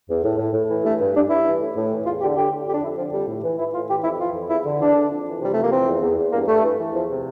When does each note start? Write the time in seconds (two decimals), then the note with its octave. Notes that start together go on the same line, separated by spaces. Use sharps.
0.09 E2
0.23 A2
0.38 A2
0.54 A2
0.69 E3
0.84 G2 A3
1.00 G2
1.14 G2 D4
1.29 G2 E4
1.45 E3
1.60 A2
1.76 A2
1.91 E3
2.05 E2 F4
2.21 D3 G4
2.37 D3 G4
2.51 D3
2.67 F2 G4
2.74 D4
2.82 F2 E4
2.97 D3 F3
3.13 F2 G3
3.27 A2
3.43 E3
3.58 E3 E4
3.73 A2 F4
3.89 E3 G4
4.03 F2 E4
4.19 E3 F4
4.34 F2
4.50 E2 E4
4.65 D3
4.80 E2 D4
4.95 D3
5.11 F2
5.26 E3
5.41 C3 G3
5.53 F2 A3
5.63 A#3
5.71 E3 C4
5.87 E2
6.01 E2
6.18 E2
6.32 G2 A#3
6.47 G2 A3
6.63 E3
6.78 E3
6.93 E2 F3
7.09 C3